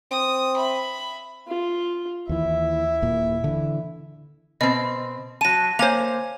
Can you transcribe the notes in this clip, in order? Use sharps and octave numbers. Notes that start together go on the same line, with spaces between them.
C4 D#6
E5 B5
F4
D#2 E3 E4 E5
D#1 A#2
D3 E3
B2 C4 D#5
F#3 A5 A#6 D#7
A#3 C5 C#5 G#5 F7